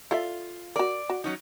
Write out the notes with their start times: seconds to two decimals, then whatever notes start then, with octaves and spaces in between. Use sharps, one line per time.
0.11 F4 A4 D5 E5
0.76 F#4 A#4 D5
1.10 F#4
1.24 F#3 C#4 D#4